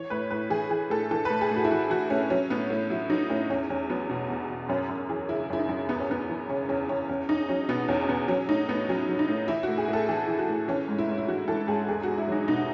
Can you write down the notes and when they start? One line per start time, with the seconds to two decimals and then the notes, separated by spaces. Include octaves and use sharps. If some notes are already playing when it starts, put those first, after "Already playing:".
Already playing: E3 C#5
0.10 A2 B4
0.30 A2 B4
0.50 E3 G#4
0.70 E3 G#4
0.90 A2 A4
1.11 E3 A4
1.25 A2 B4
1.41 G#4
1.51 A2 F#4
1.64 E4
1.71 E3 F#4
1.90 E3 F#4
2.10 A2 C#4
2.30 F#3 C#4
2.50 A2 B3
2.70 A2
2.90 F#3 E4
3.10 F#3 D#4
3.30 A2 C#4
3.50 E2 C#4
3.70 E2 C#4
3.89 F#3 B3
4.09 B2
4.30 E2
4.50 E2
4.69 F#2 C#4
4.89 F#2
5.09 E3 G#4
5.29 C#3 E4
5.50 F#2 E4
5.59 D#4
5.69 F#2
5.89 E2 B3
6.00 C#4
6.09 E2 B3
6.29 E3
6.49 C#3 C#4
6.69 E2 C#4
6.89 E2 C#4
7.09 E2 C#4
7.29 E2 D#4
7.49 F#3 C#4
7.69 B2 B3
7.88 E2 C#4
8.03 C#4
8.08 E2 B3
8.28 F#3 C#4
8.49 A2 D#4
8.68 A2 B3
8.89 F#3 C#4
9.09 F#3
9.19 D#4
9.28 A2
9.48 E3 E4
9.63 A2 F#4
9.78 G#4
9.88 A2 A4
10.08 E3 G#4
10.28 E3
10.38 F#4
10.48 A2
10.68 E3 C#4
10.88 G#2
10.98 E4
11.08 G#2
11.18 E4
11.28 E3 F#4
11.48 E3 A4
11.67 G#2 G#4
11.88 E2 G#4
12.03 E2 F#4
12.18 E4
12.28 F#3 D#4
12.48 B2 D#4